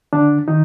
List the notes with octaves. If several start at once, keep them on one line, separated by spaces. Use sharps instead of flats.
D3 D4
D#3 D#4